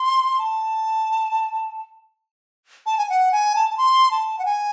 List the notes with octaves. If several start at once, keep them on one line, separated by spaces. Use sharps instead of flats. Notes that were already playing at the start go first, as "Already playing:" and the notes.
Already playing: C6
A5
A5
G#5
F#5
G#5
A5
A5
C6
A5
F#5
G#5